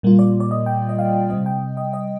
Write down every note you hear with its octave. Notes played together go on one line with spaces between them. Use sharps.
A#2 G3 A#3 F4
D5
D5
D#5
G5
D#5
F5
C3 G3 C4 D#5
G5
D#5
D#5